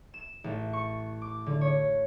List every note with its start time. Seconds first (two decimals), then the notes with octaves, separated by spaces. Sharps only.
0.14 E7
0.44 A1
0.73 C#6
1.22 D6
1.46 D3
1.61 C#5